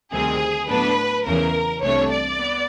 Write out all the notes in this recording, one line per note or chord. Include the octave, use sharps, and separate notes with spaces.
D2 C3 D#3 G3 C4 G#4
A2 F#3 B3 D4 B4
E2 C#3 E3 A#4
C2 C3 E3 A3 D4 C#5
D5
B3